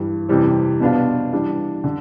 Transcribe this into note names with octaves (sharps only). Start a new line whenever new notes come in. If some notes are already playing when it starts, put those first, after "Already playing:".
Already playing: G2 E3 G3
F2 C3 E3 G3 C4
B2 B3 D4 F4
E3 G3 D4
D3